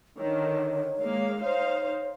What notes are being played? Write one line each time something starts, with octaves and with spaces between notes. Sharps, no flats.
D3 D#3 C#5
G#3 A#3 F5
D#4 C5 C#5 F5